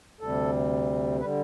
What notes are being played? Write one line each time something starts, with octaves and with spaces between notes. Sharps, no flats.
D2 C3 G3 A4
D3 G3 B4